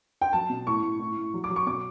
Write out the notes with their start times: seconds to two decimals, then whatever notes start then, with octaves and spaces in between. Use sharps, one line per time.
0.21 G5
0.33 F#3 A5
0.49 B2
0.67 A2 C#6
0.83 A2
1.00 A2
1.17 A2
1.34 F#3
1.44 D6
1.50 F#3
1.56 C#6
1.66 B2 D6